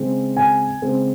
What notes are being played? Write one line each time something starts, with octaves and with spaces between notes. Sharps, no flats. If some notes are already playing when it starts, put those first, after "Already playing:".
Already playing: C#3 G#3 C4
G#5
C#3 G#3 C4